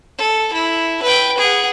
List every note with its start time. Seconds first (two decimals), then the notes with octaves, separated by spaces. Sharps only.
0.18 A4
0.53 E4
1.02 B4 G5
1.38 G#4 F#5